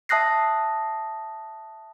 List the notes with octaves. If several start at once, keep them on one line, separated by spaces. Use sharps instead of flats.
E5 A5 D#6 F#6 A#6 C7